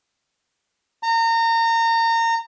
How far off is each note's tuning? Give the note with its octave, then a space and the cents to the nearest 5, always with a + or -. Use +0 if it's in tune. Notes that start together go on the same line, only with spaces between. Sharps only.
A#5 -30